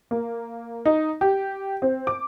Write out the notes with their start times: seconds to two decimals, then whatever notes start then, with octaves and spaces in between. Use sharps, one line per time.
0.11 A#3
0.86 D#4
1.21 G4
1.82 C4
2.07 D6